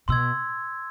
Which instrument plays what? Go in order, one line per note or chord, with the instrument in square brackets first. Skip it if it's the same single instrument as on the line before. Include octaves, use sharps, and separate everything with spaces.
[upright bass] B2 [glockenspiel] C6 E6 G#6